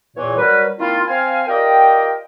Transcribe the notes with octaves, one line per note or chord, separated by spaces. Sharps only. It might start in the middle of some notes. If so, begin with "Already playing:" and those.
E2 A#2 E3 C#5
F#3 G3 A#4 B4
D#3 A#3 C4 E4 F4
C4 F5 G#5
F4 G4 A#4 D5 D#5 G5